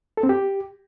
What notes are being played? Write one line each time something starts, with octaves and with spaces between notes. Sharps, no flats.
A4
C4
G4